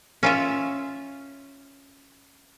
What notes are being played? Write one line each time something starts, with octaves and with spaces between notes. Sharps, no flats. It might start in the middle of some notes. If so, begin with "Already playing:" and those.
C#4 F4 E5